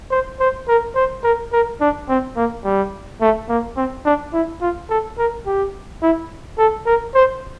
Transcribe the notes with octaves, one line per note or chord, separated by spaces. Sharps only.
C5
C5
A#4
C5
A#4
A#4
D4
C4
A#3
G3
A3
A#3
C4
D4
E4
F4
A4
A#4
G4
E4
A4
A#4
C5